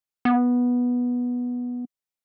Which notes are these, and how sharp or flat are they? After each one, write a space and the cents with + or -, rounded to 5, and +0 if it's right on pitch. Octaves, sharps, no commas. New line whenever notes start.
B3 -10